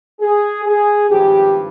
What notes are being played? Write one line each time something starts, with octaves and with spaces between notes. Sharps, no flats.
G#4
G#4
G#1 G2 F3 G4